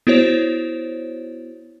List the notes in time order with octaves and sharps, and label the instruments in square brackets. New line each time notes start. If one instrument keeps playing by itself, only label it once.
[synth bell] B3 E4 F#4 C5 C#5